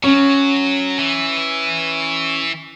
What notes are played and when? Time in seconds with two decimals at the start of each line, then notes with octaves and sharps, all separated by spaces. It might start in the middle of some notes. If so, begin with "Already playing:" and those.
0.04 F#3 C#4
0.99 E3